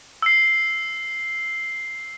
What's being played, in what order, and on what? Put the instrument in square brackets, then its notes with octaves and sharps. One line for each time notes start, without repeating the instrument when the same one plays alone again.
[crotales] E6 C7